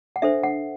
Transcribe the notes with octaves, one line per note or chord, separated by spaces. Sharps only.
F#5
D4 A4 C5 E5
F#5